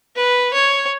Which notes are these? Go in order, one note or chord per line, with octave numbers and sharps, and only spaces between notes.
B4
C#5